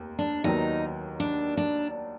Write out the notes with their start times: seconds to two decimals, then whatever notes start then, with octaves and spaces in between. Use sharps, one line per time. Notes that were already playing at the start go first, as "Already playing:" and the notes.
Already playing: F1 D#2
0.19 D4
0.44 D#2 D#3 F#3 B3 D#4
1.20 D4
1.57 D4